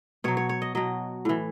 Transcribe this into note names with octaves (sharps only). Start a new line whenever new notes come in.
B2 F#3 C#5
C#5
C#5
D#5
B2 F#3 D#5
A2 E3